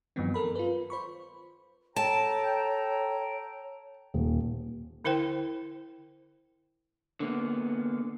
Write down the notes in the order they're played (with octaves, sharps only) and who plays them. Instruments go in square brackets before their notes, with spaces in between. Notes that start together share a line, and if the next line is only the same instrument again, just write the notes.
[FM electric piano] G2 D#3 F3 F#3 B3 C4
A4 A#4 B5
F4 B4
C5 B5 C#6
[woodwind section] A4 G5 A#5 [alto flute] C#5 [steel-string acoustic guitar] A5
[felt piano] D#1
[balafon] D3 E4 A#4 C5 G5
[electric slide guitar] D3 A#3 B3